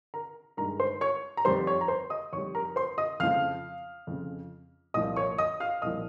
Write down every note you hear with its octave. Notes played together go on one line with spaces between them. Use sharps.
A#4 A#5
G2 D#3 G#3 A#4 A#5
C5 C6
C#5 C#6
A#5
F2 D#3 G3 C5 C6
C#5 C#6
A#5
C5 C6
D#5 D#6
F2 D#3 G3 C#5 C#6
A#4 A#5
C5 C6
D#5 D#6
F2 C#3 F3 F5 F6
F2 C#3 F3
C2 A#2 F3 D#5 D#6
C#5 C#6
D#5 D#6
F5 F6
C2 A#2 F3 D#5 D#6